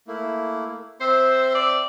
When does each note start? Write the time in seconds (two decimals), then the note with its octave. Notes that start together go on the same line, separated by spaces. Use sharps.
0.08 A3 A#3 E4
1.00 C4 C5 E5 E6
1.55 D5